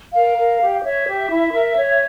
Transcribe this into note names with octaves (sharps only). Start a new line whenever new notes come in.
A#4 F5
A#4
G4
C#5 E5
G4
E4
A#4
C#5